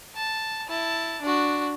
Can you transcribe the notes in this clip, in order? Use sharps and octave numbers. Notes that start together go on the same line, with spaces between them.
A5
E4 A5
D4 F#4